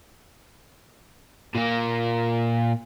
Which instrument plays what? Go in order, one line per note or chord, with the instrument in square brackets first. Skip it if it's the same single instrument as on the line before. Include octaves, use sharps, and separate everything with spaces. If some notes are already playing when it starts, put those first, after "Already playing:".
[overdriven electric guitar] A#2 A#3